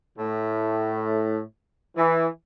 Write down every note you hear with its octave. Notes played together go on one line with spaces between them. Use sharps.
A2
E3